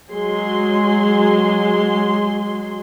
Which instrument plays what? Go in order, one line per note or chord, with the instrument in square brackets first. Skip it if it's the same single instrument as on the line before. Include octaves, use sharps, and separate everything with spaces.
[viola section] F#3 G#3 G#4 C6